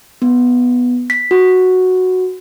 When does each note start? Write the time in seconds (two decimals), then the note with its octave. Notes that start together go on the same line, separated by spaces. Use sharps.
0.22 B3
1.10 B6
1.31 F#4